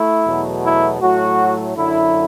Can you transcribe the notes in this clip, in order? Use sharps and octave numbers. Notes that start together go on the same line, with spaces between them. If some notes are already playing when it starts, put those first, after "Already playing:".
Already playing: A3 E4
E2 B2 F#3 A3
E4
A2 F#3 A3 F#4
F#2 D3 F#3 E4